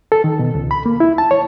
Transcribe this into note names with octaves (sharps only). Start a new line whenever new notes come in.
A4
D#3
B2
C#2
B5
A#3
E4
A5
C#5